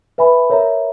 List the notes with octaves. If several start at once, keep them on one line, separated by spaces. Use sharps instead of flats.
B4 E5 G#5 B5
A#4 C#5 E5 A#5